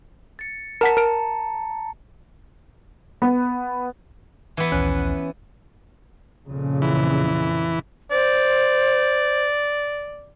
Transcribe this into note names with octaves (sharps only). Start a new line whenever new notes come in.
A6 C#7
A#4 F#5 A5 A#5 B6
A#4 D7
B3
E3 B3
A#1 D#2 C#4 F#6
F2 A#2 C#3
E3
C5 D5